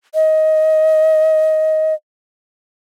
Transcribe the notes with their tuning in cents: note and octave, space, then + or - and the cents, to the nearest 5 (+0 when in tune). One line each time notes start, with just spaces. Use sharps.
D#5 +15